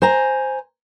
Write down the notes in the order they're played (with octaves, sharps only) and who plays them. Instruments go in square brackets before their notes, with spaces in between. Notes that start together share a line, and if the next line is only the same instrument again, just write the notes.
[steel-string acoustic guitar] C5 G#5 A#5